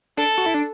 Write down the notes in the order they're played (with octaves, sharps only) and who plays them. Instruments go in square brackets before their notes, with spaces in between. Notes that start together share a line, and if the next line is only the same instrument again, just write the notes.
[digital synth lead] D4 [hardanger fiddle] A4
[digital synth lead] F#4
E4
D4